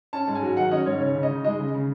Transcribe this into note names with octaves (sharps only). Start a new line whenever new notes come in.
C#4 A5
G#2
G#5
F#3
D#3 F#5
C#4 D#5
G#2 C#5
C#3 C#5
C#3
D#5
D#4
G#3 D#5
C#3
C#3